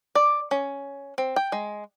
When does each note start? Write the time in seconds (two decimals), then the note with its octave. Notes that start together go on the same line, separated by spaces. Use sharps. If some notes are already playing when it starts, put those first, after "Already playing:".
0.15 D5
0.51 C#4
1.18 C4
1.36 G5
1.52 G#3